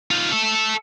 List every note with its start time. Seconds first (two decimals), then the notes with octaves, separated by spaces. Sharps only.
0.11 D#4 F4
0.32 A4 E5